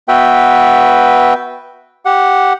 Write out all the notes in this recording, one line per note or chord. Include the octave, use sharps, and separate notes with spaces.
B3 F#4 B4 E5 G5
G4 F#5